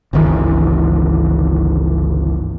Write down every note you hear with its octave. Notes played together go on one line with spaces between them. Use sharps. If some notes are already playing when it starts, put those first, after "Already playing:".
G1 C#2 D#3 E3